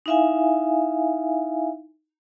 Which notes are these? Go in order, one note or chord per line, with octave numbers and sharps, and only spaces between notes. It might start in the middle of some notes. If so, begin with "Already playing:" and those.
D#4 E4 E5 F5 G#5